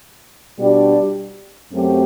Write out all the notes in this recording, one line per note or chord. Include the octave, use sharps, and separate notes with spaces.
B2 G3 D4 G4
F#2 F#3 A3 C4 G4